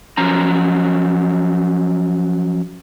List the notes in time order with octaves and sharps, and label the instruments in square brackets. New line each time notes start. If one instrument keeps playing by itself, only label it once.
[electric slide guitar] F3 F#3 C#4 A#5